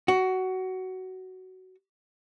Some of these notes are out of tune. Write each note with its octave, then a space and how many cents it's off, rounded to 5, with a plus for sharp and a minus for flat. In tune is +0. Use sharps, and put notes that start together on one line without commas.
F#4 +15